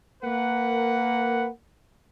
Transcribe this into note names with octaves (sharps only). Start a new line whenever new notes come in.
A#3 A#4 B4 F#5